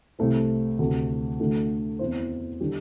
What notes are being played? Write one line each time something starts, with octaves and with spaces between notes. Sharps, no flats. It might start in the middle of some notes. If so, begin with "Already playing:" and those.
C2 C3 A3 C4
D2 C3 A3
D2 D3 A3
E2 E3 C4 E4 C5
D3 G3 D4 G4